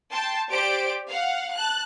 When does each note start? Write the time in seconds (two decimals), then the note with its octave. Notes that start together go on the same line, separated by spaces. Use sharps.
0.13 G5 A5 C6
0.51 G4 C5 D5 D7
1.09 F5 F#5
1.55 A5 F#6